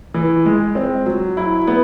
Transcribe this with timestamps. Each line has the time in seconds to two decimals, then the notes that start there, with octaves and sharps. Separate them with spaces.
0.14 E3
0.46 G#3
0.75 C4
1.06 F#3
1.37 E4
1.67 B3